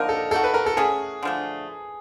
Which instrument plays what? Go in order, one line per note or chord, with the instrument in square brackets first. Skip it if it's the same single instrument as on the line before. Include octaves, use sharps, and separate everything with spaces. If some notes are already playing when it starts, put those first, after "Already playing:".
Already playing: [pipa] D3 F3 A#3 D#4 [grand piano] A#4
[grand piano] A4
[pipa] A#3 D#4 F#4 [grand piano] A4
[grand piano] B4
A#4
A4
[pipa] A3 C#4 F#4 [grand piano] G#4
[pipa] D3 F3 A3